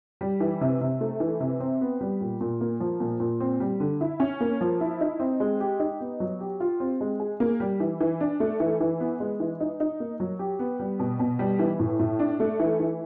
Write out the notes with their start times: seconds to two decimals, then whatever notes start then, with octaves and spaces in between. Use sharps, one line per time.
0.21 G3
0.40 E3
0.61 C3
0.81 C3
1.01 A3
1.20 E3
1.40 C3
1.60 C4
1.81 B3
2.01 G3
2.21 A#2
2.41 A#2
2.61 A#3
2.80 F3
3.00 A#2
3.20 A#2
3.40 C4
3.60 G3
3.80 D3
4.01 E4
4.20 C#4
4.40 A#3
4.61 F3
4.81 E4
5.01 D#4
5.20 C4
5.40 G#3
5.60 G4
5.80 D#4
6.00 B3
6.20 F#3
6.40 G4
6.60 F4
6.80 C4
7.01 G#3
7.20 G#4
7.40 A#3
7.60 G3
7.80 E3
8.01 E3
8.21 D4
8.40 A3
8.60 E3
8.80 E3
9.00 B3
9.20 G#3
9.40 E3
9.60 D#4
9.80 D#4
10.00 A#3
10.20 F#3
10.39 G4
10.59 B3
10.80 G3
10.99 B2
11.19 B2
11.39 G3
11.59 E3
11.79 A2
11.99 A2
12.19 D4
12.40 A3
12.60 E3
12.80 E3